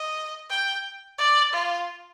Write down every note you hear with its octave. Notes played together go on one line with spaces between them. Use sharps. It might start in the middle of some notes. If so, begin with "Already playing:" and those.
Already playing: D#5
G5
D5
F4